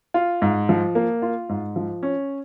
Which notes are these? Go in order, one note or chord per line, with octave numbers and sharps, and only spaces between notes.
F4
G#2
F3
A#3
F4
G#2
F3
C#4